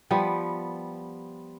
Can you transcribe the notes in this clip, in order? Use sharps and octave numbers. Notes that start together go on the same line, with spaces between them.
F3 G3 B3